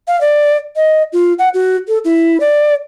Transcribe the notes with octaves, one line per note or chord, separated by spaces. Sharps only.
F5
D5
D#5
F4
F#5
F#4
A4
E4
D5